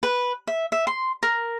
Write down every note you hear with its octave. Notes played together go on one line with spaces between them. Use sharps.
B4
E5
E5
C6
A#4